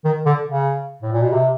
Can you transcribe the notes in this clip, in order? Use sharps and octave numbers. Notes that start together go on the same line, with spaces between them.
D#3
D3
C#3
A2
A#2
B2
C3